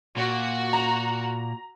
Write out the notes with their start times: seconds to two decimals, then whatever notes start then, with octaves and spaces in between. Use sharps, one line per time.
0.17 A#2 F#4
0.73 A#5